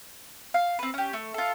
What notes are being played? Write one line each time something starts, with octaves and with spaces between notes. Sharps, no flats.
F5
C4 B4
C#4 G4
A3
F4 A4